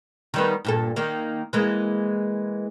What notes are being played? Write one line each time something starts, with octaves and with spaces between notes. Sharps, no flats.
D#3 G3 B3
G2 A#2 A4
D#3 A#3
E3 G#3 A#3